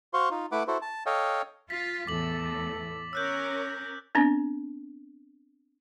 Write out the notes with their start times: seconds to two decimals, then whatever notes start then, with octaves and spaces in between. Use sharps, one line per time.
0.14 F#4 C5 F5 C6 C#6
0.31 D#4 F4
0.52 A3 E4 B4 F#5 D6
0.67 E4 F#4 A4 C5
0.82 A5
1.06 A4 C#5 D#5 F5 G5
1.70 F4 A6 B6
2.07 E2 A2 E3 A4 D6 F#7
3.13 C#4 A#4 C#5 E6 F#6 G6
4.15 B3 C4 D4